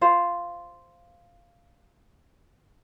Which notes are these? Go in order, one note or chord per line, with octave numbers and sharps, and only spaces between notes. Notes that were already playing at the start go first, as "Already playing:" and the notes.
F4 C5